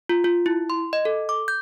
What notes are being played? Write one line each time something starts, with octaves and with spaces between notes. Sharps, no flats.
F4
F4
E4
C6
D#5
A4
D6
G6